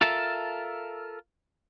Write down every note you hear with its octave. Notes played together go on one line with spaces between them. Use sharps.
F4 A4 A#4 E5 A5